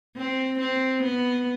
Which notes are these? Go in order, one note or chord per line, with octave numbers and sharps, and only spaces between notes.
C4
C4
B3